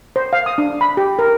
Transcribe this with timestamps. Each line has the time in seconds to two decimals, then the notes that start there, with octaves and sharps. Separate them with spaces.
0.16 C5
0.33 F5
0.46 D#6
0.58 D4
0.81 B5
0.97 G4
1.19 A#4